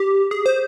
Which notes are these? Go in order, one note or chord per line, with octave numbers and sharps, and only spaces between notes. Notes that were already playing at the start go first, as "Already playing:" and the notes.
Already playing: G4
G#4
C5